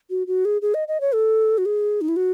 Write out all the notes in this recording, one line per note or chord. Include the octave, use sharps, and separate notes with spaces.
F#4
F#4
G#4
G#4
D#5
D#5
C#5
A4
F#4
G#4
D#4
E4
F#4